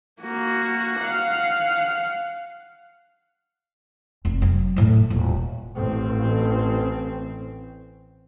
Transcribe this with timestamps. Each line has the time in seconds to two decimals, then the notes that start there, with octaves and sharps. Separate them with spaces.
0.21 A#3 F#4
1.03 F5 F#5
4.25 F1
4.42 F#3
4.76 E2 A2
5.10 D#1
5.76 A1 C4